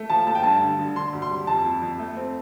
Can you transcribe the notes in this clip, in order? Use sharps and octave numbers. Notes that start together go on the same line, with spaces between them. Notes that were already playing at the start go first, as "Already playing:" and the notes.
Already playing: A3
F3 A5
A3 A5
G5
G2 A5
D3
D3
D3 C6
D2
C6
G3
F2 A5
F2
F2
A3
C4